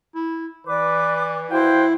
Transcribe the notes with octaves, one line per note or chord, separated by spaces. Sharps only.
E4
E3 B4 D5 D6
E4 F#4 C5 F5 G5